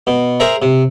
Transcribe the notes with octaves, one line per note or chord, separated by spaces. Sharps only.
B2
G#4 A#4 C5 E5 A#5
C3